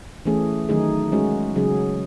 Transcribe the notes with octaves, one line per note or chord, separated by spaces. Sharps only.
E3 A3 C#4 G#4
D#3 F#3 A3 D#4 G#4
G#3 C#4 F#4
C#3 F#3 C#4 G#4